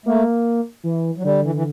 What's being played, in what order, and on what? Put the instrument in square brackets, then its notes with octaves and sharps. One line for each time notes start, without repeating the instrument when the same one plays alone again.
[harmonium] A3 [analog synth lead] A#3
[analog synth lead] E3
[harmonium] F#3
[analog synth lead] D3 [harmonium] G3
[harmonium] E3
E3